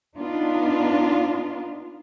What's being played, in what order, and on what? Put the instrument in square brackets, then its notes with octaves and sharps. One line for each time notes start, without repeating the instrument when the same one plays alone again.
[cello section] B3 D4 D#4 F4